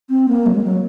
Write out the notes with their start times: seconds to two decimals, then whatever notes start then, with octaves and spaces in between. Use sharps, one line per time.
0.10 C4
0.28 A#3
0.46 F#3
0.56 G#3
0.63 F#3